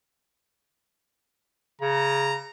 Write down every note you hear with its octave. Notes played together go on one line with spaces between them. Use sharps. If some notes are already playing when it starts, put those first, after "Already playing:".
C#3 A#5